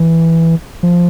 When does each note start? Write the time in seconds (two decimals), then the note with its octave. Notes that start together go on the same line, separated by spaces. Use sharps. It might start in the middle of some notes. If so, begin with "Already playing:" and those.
Already playing: E3
0.83 F3